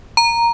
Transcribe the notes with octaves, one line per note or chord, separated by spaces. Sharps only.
A#5